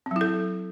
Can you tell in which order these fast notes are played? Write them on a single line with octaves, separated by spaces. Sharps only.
C4 F#3 E4 A4